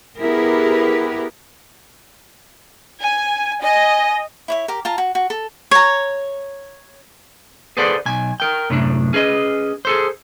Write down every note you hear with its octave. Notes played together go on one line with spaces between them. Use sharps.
B3 E4 G4 G#4 A#4 B4
G#5
D#5 G#5
E4 C#5 E5
G4 A#4
F4 A5 A#5
F#4
F#4
A4
C#5 A#5
G#4 A4 B4 C5 D5 F#5
B1 G#5
A#4 G5
F#2 A2 C3 D4
C#4 G#4 B4 D#5
G#4 A4 C5